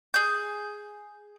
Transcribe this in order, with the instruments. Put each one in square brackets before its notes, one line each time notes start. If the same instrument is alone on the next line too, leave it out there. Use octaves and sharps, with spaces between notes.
[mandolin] G#4 G6